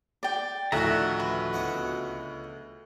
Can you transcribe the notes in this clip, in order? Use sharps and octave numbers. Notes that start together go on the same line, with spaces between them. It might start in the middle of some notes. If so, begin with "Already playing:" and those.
D5 G5
D2 A2 D#3 F3 F#4 E5 A#5
B4
C#2 B3 F#5